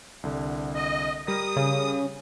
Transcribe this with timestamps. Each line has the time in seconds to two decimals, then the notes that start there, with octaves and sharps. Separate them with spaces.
0.23 C2 D3
0.75 D#5
1.27 G3 A#4 D#6 A#6
1.57 C#3